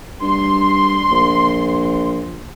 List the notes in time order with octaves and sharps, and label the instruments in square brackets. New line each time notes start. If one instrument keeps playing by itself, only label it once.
[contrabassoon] G2 [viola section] C6
[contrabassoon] A#1